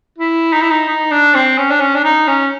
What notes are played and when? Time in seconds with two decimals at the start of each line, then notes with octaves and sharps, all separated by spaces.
0.18 E4
0.53 D#4
0.62 E4
0.71 D#4
0.88 D#4
1.12 D4
1.35 C4
1.58 C#4
1.71 D4
1.80 C#4
1.95 D4
2.04 D#4
2.28 C#4